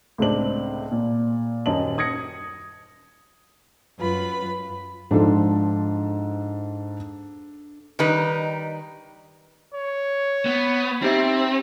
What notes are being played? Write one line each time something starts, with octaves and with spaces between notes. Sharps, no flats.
C#2 A2 C3 C4 D4 F#7
A#2
D#1 F#2 D#5 A5 F#7
D#6 G#6 A#6 C#7
F#2 F4 B4 B5
G#2 F3 D4 A4
D#3 G3 D#4 B4
C#5
B3
C4 D#4 G4 E5